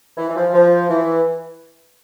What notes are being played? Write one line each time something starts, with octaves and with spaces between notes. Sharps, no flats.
E3
E3
F3
F3
E3